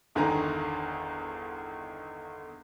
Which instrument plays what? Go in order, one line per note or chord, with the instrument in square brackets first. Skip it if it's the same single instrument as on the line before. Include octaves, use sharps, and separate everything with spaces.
[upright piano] G1 E2 D3 D#3 G#5 A#5